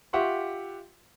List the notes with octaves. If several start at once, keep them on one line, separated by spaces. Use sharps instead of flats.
F4 G4 E5 F#5 C6 C#6